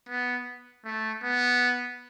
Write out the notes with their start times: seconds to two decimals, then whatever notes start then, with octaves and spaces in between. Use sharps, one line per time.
0.09 B3
0.85 A3
1.23 B3